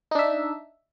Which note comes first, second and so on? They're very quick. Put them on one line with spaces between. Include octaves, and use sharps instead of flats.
D#4 D4 E5